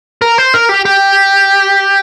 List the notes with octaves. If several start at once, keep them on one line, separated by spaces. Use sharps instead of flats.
A#4
C5
A#4
G4
G4